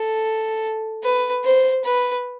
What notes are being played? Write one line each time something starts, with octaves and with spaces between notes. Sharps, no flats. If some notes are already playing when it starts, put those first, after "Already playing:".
Already playing: A4
B4
C5
B4